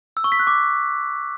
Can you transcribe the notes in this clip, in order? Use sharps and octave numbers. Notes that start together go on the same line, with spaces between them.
E6
C#6
B6
F#6
D6